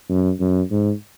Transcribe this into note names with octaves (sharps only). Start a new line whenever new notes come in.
F#2
F#2
G#2